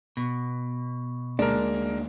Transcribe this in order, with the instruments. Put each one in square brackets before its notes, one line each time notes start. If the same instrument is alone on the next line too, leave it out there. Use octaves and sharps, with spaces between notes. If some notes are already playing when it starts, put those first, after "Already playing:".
[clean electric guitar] B2
[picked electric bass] D2 A#3 [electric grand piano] G#3 A#4 [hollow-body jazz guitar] D4